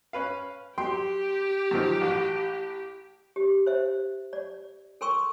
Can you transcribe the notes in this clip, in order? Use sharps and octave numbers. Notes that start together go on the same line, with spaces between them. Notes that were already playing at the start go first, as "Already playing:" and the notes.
C#4 B4 F5
F#3 G4 G5 C6
F#2 D#3 F3
A1 F#4
G4
C5 E5
D5
A4 A#4 G5 C6 C#6 E6